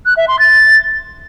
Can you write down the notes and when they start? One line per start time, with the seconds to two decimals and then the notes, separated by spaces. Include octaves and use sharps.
0.06 F#6
0.17 E5
0.28 C6
0.39 A6